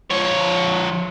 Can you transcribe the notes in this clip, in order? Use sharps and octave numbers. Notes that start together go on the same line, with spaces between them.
F3 C#5